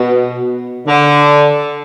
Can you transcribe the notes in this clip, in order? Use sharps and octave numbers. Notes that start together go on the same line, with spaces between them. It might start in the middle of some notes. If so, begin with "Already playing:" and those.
Already playing: B2
D3